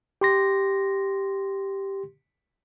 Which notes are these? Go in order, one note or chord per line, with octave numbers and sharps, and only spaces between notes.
G4 C6 A#6